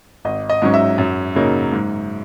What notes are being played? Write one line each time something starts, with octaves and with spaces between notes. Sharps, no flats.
G#1 D#5
D#5
G#2 F#3 C#4
E5
F#2
C#3 F#3 A#3 D#4
G#2